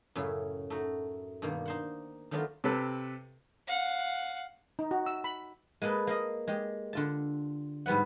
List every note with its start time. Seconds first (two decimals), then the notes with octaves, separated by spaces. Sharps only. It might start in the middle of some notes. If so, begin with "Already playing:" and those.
0.16 F#2 A2 C#3 E4
0.70 A3 D#4 F#4
1.42 G2 B2 D#3 A#3
1.66 D#4 C5 F#5
2.31 D#3 F#3 A3 B3 D4 F4
2.64 C3 G4 A4 B4
3.67 F5 F#5
4.79 D#4
4.91 F#4
5.06 E6
5.24 B5
5.82 G#3 A#3 G#4 A4 B4
6.07 A#3 A#4 D#5
6.47 G#3 G4
6.93 D3 F4 A5
7.86 G#2 G3 B3 B4 F#5